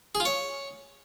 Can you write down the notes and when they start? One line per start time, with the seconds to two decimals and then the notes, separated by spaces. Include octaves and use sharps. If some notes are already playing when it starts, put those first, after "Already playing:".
0.15 G#4
0.20 F4
0.25 C#5